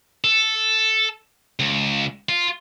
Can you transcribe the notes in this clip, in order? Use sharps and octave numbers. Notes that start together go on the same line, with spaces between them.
A4
C#2
F4